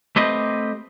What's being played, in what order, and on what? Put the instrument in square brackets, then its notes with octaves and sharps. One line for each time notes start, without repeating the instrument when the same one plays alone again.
[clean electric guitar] A3 C4 G4 B4 C5 D#5